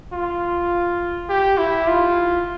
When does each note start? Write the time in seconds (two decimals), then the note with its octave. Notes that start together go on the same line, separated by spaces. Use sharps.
0.13 F4
1.29 G4
1.58 E4
1.87 F4